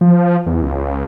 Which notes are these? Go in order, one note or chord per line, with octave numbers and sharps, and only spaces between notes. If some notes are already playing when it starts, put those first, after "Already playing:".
F3
E2
C#2